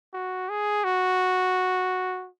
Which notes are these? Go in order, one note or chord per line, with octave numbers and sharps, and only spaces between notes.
F#4
G#4
F#4